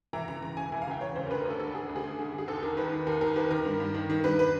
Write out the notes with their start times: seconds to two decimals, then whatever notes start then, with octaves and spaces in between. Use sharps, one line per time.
0.13 E3 A#5
0.28 C#2 A#5
0.42 C#3 A#5
0.57 C#2 G#5
0.72 E3 G#5
0.82 F5
0.87 C#2 G5
1.01 C#3 C#5
1.16 C#2 C5
1.26 A#4
1.31 D2 B4
1.40 A#4
1.45 D2 A4
1.60 D3 A4
1.75 D3 G#4
1.89 D2
1.96 G#4
2.04 D2
2.19 D3
2.33 D3
2.38 G#4
2.48 D#2 A4
2.63 D#2 A#4
2.77 D#3 B4
2.92 D#3
3.07 D#2 A#4
3.21 D#2 A#4
3.36 D#3 B4
3.51 D#3 A#4
3.65 G2
3.80 G2
3.94 D#3
4.10 D#3
4.24 G2 B4
4.39 B4